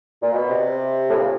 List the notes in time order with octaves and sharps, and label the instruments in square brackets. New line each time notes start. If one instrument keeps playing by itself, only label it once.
[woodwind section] A#2
B2
C3
A2
A#2